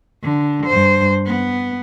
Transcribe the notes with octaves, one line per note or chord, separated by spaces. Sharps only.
D3
G2 C5
B3